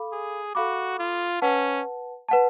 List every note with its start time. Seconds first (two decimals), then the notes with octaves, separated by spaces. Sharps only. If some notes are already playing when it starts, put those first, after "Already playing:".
Already playing: A4 F5 B5 D6
0.12 G#4
0.55 F#4 A4 F5 B5 D6
0.99 F4
1.42 C#4 B4 F#5 A5
2.29 B4 F#5 A5